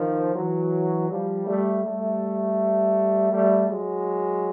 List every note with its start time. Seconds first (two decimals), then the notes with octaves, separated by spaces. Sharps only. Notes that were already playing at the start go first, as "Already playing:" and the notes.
Already playing: D#3 F3
0.35 E3 F#3
1.10 F3 G3
1.47 G3 A3
1.84 G3 A3
3.33 G3 A3
3.70 F#3 G#3